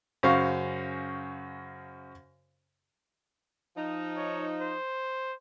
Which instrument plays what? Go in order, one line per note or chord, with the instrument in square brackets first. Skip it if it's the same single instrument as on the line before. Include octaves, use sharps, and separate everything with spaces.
[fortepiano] F#2 C#3 F#4 C5 F5 C#6
[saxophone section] F3 D#4
[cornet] C#5
C5